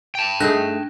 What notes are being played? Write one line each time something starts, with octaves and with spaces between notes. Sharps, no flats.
G5 A5
A3 D4 D#4 G#4 F#6 A#6